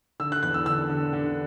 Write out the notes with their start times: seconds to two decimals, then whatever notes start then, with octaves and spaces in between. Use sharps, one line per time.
0.20 D3 E6
0.32 F#6
0.43 E2 F#6
0.54 E6
0.66 D3 E6
0.89 D3
1.13 D3